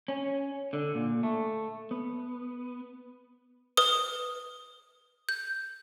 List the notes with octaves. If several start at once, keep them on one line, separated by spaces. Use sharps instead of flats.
C#4
D3
A#2
A3
B3
B4 D#6
G6